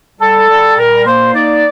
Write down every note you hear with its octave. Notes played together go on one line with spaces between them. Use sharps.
G3 A4
G3
A#2 A#4
A#3 C5
D#4 D5